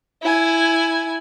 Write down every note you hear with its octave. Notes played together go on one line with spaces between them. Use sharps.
E4 G#5